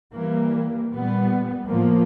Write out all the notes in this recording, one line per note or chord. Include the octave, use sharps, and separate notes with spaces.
E3 G3 A#3
A#2 G3 B3
A2 F3 A#3